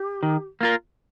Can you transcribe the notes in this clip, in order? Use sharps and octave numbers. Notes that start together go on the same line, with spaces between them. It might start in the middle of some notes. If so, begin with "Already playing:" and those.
Already playing: G4
D#3
A#3 F4 A#4